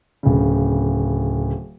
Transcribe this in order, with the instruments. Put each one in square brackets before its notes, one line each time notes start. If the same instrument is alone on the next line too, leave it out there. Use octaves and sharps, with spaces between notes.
[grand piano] D1 C#3